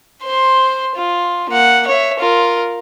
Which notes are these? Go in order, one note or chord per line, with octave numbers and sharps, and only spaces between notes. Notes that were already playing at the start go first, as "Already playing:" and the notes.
C5 C6
F4
A#3 F#5
C#5 E5
F4 A#4